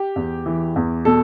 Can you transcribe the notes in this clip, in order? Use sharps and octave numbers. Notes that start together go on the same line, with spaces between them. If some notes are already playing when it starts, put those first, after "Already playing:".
Already playing: G4
E2
E3
E2
B2 A4